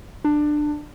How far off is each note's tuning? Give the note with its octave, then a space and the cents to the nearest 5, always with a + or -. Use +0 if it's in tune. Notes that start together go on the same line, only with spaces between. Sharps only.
D4 +20